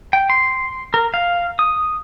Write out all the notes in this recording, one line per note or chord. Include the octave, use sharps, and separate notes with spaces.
G5
C6
A#4
F5
D#6